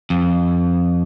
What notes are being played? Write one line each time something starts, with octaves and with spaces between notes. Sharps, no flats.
F2